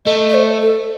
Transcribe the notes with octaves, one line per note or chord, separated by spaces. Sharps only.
A3 D#5
D#5
C5
A4